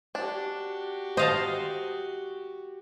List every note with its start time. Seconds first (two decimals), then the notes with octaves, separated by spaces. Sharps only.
0.15 D4 F#4 G4
1.17 C5 D#5 F5 A5